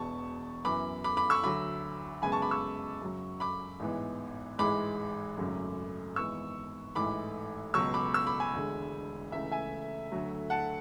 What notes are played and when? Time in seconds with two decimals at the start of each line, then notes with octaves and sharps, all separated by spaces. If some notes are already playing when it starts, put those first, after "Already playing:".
Already playing: E1 E2 B2 A5 C#6
0.65 F#2 E3 B3 B5 D6
1.04 B5 D6
1.17 B5 D6
1.30 C#6 E6
1.43 D2 D3 F#3 B5 D6
2.22 F#2 C#3 G#3 B3 G#5 B5
2.32 A5 C#6
2.42 B5 D6
2.51 C#6 E6
3.01 F#2 C#3 F#3
3.40 B5 D6
3.80 A1 G#2 E3 B3
4.59 A1 G#2 E3 G#3 B5 D6
5.37 G#1 F#2 C#3 F#3 A3
6.16 G#1 G#2 E3 B3 C#6 E6
6.95 A1 G#2 E3 A3 B5 D6
7.74 C#2 B2 F#3 C#6 E6
7.94 B5 D6
8.14 C#6 E6
8.27 B5 D6
8.40 G#5 B5
8.54 E1 D2 D3 G#3
9.32 C#2 C#3 E3 A3 E5
9.52 E5 G#5
10.11 D2 D3 F#3 A3
10.50 F#5 A5